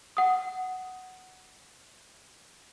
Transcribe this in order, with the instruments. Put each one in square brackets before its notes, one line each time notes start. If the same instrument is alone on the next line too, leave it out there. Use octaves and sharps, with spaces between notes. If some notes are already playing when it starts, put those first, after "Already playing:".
[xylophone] F#5 D#6